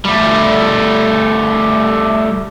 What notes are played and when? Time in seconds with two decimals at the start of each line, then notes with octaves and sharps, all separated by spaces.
0.05 G3 A3